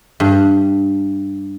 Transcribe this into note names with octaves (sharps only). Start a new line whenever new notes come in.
G2